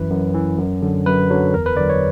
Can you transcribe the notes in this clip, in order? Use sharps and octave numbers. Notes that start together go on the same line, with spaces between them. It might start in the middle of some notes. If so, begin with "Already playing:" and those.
Already playing: F#2 E3 B4
F#2
E3
F#2
D3 F#3
F#2 B4
D3 F#3
E2 A#4
B4
D3 F#3 D5
C#5